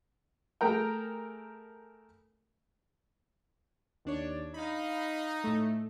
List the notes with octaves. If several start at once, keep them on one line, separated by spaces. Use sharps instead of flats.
A3 G#4 A#4 G5
D#2 D4 C#5
D#4 F5 B5
A2 A3